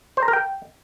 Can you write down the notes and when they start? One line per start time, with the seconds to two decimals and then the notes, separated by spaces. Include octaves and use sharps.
0.17 C5
0.23 A#5
0.28 A#4
0.33 G5